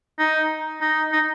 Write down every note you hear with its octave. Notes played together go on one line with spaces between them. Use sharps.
D#4
D#4
D#4